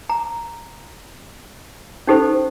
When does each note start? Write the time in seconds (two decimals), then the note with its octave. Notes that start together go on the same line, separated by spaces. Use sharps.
0.10 A#5
2.07 C#4 D#4 G4 A4 C5